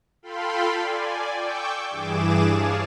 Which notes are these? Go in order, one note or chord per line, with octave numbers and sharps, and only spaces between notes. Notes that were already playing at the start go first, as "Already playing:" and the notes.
F4 A4 F5 G5 B5 C6
D5 G#5
G5 C#6 D6 E6 G6
G2 E3 G#4 D6 E7
G#4 C#5 D5 F5 A5